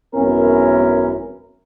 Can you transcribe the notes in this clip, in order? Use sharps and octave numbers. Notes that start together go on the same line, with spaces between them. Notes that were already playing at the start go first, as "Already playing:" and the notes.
G#1 F#2 B3 C#4 E4 A#4